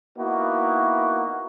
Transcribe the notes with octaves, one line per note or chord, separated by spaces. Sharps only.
A#3 B3 D#4 E4 F#4